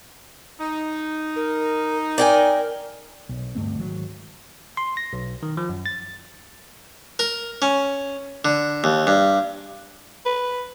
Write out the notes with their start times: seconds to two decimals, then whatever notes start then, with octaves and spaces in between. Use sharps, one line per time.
0.61 D#4
1.36 A#4
2.18 A#4 D5 G5 G#5
3.29 B1
3.55 D2 G2 A3 C4
3.79 G#1 F#3
4.77 C6
4.97 A#6
5.13 B1
5.43 D#3
5.57 F3
5.69 F#2
5.86 A6
7.19 A#4
7.62 C#4
8.45 D3
8.84 D#2
9.07 G2
10.25 B4